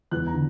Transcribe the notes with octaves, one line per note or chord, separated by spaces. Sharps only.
E2 F#6
A#5
D3